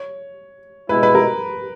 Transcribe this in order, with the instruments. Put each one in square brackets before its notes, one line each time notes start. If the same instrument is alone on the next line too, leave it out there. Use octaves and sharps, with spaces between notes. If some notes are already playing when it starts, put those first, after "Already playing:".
Already playing: [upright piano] C#5
[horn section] B2 G#3 B3 E4 [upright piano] B4
[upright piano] B4
A#4